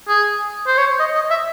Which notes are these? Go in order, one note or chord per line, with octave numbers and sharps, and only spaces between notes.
G#4
C5
C#5
D#5
D#5
E5